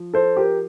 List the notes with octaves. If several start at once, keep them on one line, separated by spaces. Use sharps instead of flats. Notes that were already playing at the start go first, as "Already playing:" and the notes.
Already playing: F3
A4 C5
G4 A#4